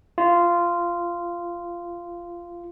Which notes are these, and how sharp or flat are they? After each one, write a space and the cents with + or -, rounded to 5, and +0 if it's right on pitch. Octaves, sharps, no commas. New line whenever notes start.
F4 -15